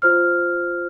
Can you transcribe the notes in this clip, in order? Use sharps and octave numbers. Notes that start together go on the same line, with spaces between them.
F4 C5 F6